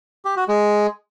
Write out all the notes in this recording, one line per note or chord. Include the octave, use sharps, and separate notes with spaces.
G4
F#4
G#3